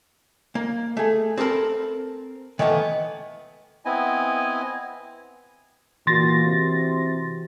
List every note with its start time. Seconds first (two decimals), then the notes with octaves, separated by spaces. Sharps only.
0.55 A#3
0.97 A3 G#4
1.37 C4 G4 A4 A#4 B5
2.59 D#3 E3 A3 B3
3.85 B3 C4 E4 D#5 G#5
6.07 A#2 E3 F#4 C6 A6 A#6
6.44 C3